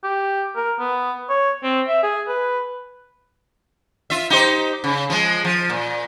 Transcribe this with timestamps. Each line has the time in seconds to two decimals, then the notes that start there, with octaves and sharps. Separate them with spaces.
0.04 G4
0.56 A#4
0.79 B3
1.29 C#5
1.63 C4
1.88 E5
2.03 G#4
2.28 B4
4.10 F4 E5
4.30 D#4 G4 C5
4.84 C#3
5.10 F3 G#3
5.45 F3
5.70 A#2